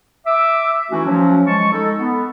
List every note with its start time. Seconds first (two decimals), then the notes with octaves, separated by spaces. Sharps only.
0.27 E5 D6
0.91 E3 A3 C#4 D#4 E4 F#4
1.06 F3 F#3 C#4
1.46 G#3 A5 C#6
1.72 G#3 D#4 A4
1.99 B3